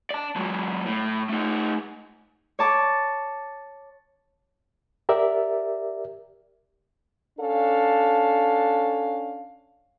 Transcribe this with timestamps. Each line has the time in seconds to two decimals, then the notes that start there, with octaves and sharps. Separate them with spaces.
0.10 D5 A5
0.36 F#3 G#3
0.86 A2
1.29 A3 D#4
2.59 C#5 A5 D6
5.09 G4 A#4 D5 E5
7.39 C#4 D4 A4 F5